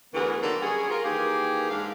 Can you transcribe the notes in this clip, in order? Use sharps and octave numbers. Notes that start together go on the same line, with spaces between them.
D2 E3 B3 F#4 G#4 A#4
D3 D#3 F#3 A#3 F#4 A4
G3 C#4 F#4 G#4
F4 A#4
D#3 E3 A#3 G4 G#4
G#2 D4 F5